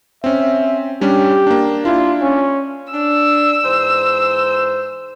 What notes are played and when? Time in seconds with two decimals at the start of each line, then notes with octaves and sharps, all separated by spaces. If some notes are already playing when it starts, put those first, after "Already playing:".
0.24 C4 C#4 E5
1.01 G3 C#4 D4 G4
1.47 A#3 D4
1.85 D4 E4 F4
2.22 C#4
2.93 D4 E6
3.64 G#2 E3 C5